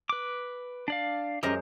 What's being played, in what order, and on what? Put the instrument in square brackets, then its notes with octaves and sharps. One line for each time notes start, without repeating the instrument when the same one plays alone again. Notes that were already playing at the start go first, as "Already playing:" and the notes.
[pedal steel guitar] B4 D6
D4 D5 F5
[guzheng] F#2 G#3 C5 [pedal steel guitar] G4 A#4 D#5